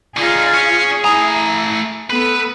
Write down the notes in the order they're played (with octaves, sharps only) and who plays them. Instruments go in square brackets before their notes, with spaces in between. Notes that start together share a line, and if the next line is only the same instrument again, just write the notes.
[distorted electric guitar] D3 D#4 [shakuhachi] F4 [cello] G#4
[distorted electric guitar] C#4
[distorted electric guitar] A3 A#5 [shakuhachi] E4 [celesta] G#5 D#6 F7
[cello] B3 [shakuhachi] A4 [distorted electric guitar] B4